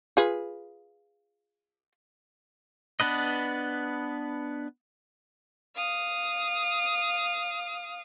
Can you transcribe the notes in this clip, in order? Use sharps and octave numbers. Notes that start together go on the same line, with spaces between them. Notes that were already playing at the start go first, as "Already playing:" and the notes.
F4 G#4 B4
B3 D4 B4 D#5
F5 D#6